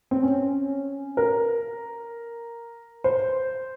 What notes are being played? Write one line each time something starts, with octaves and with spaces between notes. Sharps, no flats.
C4
C#4
A#4
C5